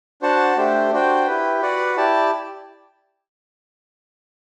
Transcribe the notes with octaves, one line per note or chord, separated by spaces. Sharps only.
D4 F#4 C5 F#5 A5
A3 D4 G4 C5
D4 F#4 C5 G5
E4 G4 B4
F#4 B4 D5 F#5
E4 G4 D5 A5